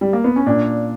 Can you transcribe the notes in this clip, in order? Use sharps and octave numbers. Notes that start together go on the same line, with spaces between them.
G3
A#3
B3
C#4
A#2 D4